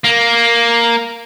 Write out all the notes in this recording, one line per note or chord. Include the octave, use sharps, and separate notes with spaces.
A#3